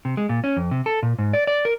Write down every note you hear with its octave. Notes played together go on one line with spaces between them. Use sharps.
C3
G#3
A#2
C#4
F2
C3
A4
A#2
G#2
D5
D5
A#4